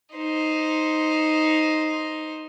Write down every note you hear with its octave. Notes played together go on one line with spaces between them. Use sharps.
D#4 C5